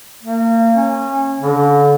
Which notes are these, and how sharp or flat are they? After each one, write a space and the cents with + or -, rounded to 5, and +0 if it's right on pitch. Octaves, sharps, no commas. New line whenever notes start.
A#3 -35
C#4 -25
D3 -35